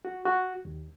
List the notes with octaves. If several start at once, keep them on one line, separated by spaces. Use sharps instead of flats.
F#4
F#4
D#2